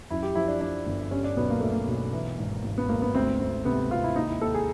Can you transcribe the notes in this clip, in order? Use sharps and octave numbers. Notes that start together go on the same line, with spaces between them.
F#2 E4
G4
F3 E4
D4
F3 D4
G1
G3 C#4
D4
B1 B3
A#3
B1 A3
A#3
B1
E3
G#1
G#1
B3
G#1 A#3
B3
D2 C4
D2 C4
C3 B3
C3 F4
E4
D#2 D#4
E4
D#2 A4
G#4